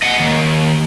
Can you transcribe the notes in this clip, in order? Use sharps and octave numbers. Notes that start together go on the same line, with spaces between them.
D#5 F#5
D#2